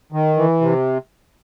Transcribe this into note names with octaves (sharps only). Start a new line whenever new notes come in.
D#3
E3
C3